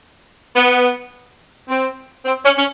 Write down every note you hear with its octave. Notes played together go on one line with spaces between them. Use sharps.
B3
C4
C4
C#4
C#4